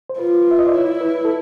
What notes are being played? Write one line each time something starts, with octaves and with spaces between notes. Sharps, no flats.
C5
F4 B4
E5
D#5
D5
E4 C#5
B4
A4